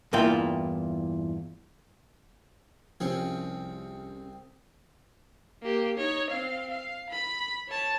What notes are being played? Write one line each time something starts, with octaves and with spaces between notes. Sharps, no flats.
E2 G2 A#2 E4 F4 G5
C2 F3 C4 C#4 G#4
A#3 G4
D#4 C#5
C4 F5
F5
B5
C#5 A5